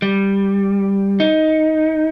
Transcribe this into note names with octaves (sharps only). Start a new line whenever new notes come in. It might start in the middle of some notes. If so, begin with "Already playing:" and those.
G3
D#4